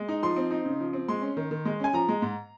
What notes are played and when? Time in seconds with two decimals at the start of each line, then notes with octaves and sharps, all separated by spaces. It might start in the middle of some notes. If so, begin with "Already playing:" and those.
Already playing: G#3
0.09 D#4
0.23 F3 C6
0.36 C4
0.51 D#4
0.65 C#3
0.80 F3
0.93 C4
1.08 G#3 C6
1.22 C#4
1.37 D#3
1.51 D#3
1.65 G#3
1.80 C#4 G#5
1.93 F3 A#5
2.09 G#3
2.22 G#2